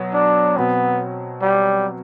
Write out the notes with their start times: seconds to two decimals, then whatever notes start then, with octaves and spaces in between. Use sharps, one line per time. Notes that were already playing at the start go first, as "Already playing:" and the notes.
Already playing: B2 F#3 B3
0.14 D4
0.57 B2 F#3 B3 C4
1.42 G3